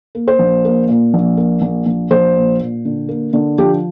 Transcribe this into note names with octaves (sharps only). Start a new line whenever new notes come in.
A#3
C5
A#1
A#3
A#2
A#1
A#3
A#1
A#1
A#1 C5
A#2
A#2
D3
A#3
D3
F3 G4